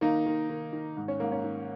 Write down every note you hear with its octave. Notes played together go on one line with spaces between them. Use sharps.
D#3 A#3 D#4
D#3
D#3
D#3
G#2
C#4
G#2 A#3
C#4
D#3